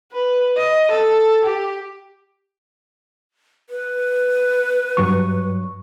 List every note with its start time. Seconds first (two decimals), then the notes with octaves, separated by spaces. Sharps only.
0.12 B4
0.57 D#5
0.91 A4
1.44 G4
3.70 B4
4.97 G2 F#3 C#6